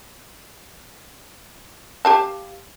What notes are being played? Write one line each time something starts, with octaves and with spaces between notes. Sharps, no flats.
G4 F5 A5